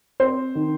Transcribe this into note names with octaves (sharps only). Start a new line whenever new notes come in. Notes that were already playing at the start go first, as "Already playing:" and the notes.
C4 C5
D#3